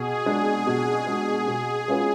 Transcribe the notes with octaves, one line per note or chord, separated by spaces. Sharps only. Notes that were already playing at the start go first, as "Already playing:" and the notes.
Already playing: B2 G#4
G#3 D4
B2
G#3 D4
B2
G#3 C#4 F4 B4